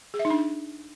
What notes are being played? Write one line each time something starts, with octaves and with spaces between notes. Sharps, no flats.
G#4
E5
D#4
D4